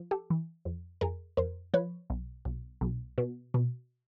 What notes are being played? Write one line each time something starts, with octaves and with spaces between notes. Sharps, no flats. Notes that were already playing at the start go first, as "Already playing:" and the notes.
Already playing: F3
G4 A4
E3
F2
F2 G#4 A#4
F2 A#4 C5
F3 B4 C#5
B1
B1
B1
B2
B2